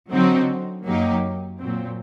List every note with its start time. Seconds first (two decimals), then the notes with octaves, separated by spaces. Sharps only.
0.12 D3 F#3 C4 D#4 F#4
0.85 F#2 F#3 A#3 D#4 G4
1.60 A#2 F#3 C4